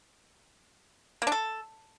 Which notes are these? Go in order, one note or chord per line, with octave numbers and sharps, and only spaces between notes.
A#3
D4
A4